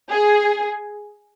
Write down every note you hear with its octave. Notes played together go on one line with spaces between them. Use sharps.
G#4